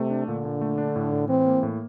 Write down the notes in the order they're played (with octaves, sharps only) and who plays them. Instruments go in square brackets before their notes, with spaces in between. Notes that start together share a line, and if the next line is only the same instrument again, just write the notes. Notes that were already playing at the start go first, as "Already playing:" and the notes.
Already playing: [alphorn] C3 [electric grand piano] A3
[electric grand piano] D4
[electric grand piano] A#2 [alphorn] D3
[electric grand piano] A#2
A3
D4
A2
A2
[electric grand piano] E3 [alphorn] C4
[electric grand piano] A#3
A2